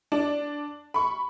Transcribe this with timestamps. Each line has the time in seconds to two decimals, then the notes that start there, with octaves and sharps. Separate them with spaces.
0.12 D4
0.94 B5 C#6